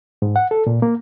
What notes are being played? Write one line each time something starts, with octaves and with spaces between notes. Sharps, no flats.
G#2
F#5
A4
A#2
A#3